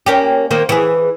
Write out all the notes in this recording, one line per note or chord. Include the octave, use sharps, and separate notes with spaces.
A#3 C#4 G4
D#3 A#3 C4
E3 G#4